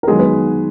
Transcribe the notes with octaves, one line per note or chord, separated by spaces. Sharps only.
A#4
D#3 F#3 G#3 B3 G#4
B3 B4